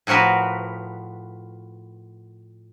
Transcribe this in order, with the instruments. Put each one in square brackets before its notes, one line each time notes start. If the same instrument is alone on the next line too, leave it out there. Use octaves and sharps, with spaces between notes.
[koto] A2 F3 F#4 A#4 B4